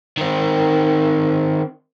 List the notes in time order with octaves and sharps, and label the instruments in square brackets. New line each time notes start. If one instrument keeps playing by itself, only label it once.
[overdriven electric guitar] D#3 C4